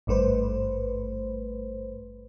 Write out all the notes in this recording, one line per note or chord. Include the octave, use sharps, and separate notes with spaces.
G#1 G2 A3 B4 C5